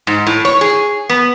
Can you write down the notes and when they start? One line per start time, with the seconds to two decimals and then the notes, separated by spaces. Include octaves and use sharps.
0.07 G#2
0.27 A2
0.45 C#5
0.61 G#4
1.10 B3